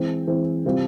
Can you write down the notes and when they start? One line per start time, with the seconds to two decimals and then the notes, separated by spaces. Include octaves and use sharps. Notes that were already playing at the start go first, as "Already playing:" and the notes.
Already playing: E3 G#3 C4
0.27 E3 G#3 C4
0.65 C3 G3 C4 F4